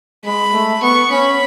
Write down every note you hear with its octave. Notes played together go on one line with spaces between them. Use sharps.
G#3 B5
A3
B3 C#6
C#4 B5